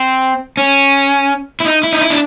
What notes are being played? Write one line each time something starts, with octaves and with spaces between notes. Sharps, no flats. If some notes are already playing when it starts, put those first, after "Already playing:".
Already playing: C4
C#4
E4
D#4
E4
D#4
E4
D4